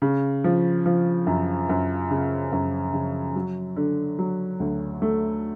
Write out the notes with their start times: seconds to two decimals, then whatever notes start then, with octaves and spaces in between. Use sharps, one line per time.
0.02 C#3
0.44 F3
0.86 F3
1.27 F#2
1.69 F#2
2.10 C#3
2.52 F#2
2.93 C#3
3.36 F#3
3.76 D3
4.19 F#3
4.60 D2
5.02 A3